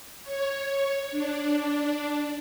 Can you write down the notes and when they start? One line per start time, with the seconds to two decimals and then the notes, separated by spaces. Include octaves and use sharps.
0.23 C#5
1.11 D4